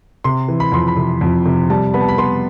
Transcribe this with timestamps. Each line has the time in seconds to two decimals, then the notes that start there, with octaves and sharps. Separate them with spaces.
0.24 C3 C6
0.48 E3
0.60 B5
0.72 F2 C6
0.88 B5
0.97 C3
1.21 F2
1.46 C3
1.70 G3 A5
1.94 B3 B5
2.01 A5
2.08 B5
2.18 B3 C6